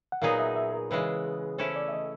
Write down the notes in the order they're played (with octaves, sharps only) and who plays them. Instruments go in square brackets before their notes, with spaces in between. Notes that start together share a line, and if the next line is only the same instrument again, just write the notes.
[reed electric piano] F#5
[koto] A#2 F#3 B3 D#4 G#4 [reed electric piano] F5
[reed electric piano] E5
E5
A#4
[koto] C#3 E3 G#3 [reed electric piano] B4
[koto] A3 C#4 E4 A4 [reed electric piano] C5
[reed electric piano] D5
E5
D#5